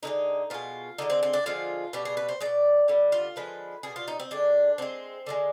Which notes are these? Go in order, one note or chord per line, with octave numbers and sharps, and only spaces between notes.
D3 F3 G#3 D#4
B2 G#3 F4
D3 G#3 D#4
C4
C4
D4
D3 F3 G#3 F4
B2 G3 G4
G#4
B4
C5
B2 G#3 D5
D3 G3
F4
D3 F3 G#3 B4
B2 G3 G#4
F4
D#4
C4
D3 G#3 D4
D3 G#3 C4
D3 F3 G#3